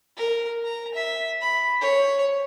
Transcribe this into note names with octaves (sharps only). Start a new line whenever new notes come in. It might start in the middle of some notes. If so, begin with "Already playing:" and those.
A#4
A#5
E5
B5
C#5